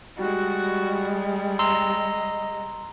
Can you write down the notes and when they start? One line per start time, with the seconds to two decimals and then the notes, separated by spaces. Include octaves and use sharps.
0.17 G3 G#3 F#4
1.59 D#5 A#5 C6 E6